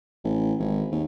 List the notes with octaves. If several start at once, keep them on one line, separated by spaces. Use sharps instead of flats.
A1
G#1
D#2